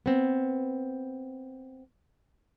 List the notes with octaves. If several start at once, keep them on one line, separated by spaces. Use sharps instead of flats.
B3 C4